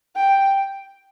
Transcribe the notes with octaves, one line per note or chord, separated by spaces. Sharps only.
G5